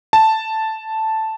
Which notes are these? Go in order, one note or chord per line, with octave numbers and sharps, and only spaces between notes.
A5